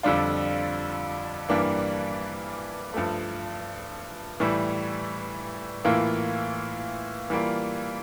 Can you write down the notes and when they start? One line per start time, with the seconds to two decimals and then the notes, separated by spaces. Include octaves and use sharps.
0.03 F2 D3 G3 D4 F4
1.49 G2 E3 G3 A#3 D4
2.94 G2 F3 A3
4.40 A2 E3 G3
5.85 A2 E3 A#3 F4
7.30 E3 G3 A#3 F4